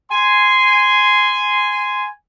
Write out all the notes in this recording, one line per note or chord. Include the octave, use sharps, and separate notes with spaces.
G#5 C6